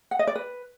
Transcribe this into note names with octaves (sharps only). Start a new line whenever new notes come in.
F#5
D#5
D5
B4